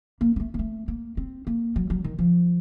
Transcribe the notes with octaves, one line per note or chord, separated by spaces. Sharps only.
A#3
A#3
A3
A#3
A3
A#3
C4
A#3
F#3
F#3
D#3
F3